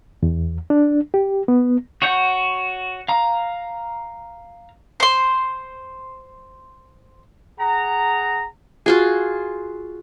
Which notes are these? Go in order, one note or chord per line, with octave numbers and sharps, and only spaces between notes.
E2
D4
G4
B3
F#4 C#5 F#5 G6
F5 A#5
C5 C6
G#4 F#5 A#5
F4 F#4 G#4